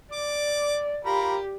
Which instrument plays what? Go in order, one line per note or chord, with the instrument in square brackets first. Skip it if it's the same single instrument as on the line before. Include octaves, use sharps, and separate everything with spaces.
[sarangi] D5 [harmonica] D6
[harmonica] F4 A#4 B5 [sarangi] G4